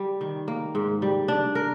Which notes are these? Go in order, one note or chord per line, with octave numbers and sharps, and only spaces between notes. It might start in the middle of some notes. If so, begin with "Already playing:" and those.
Already playing: G3
D#3
A#3
G#2
G3
D4
A#4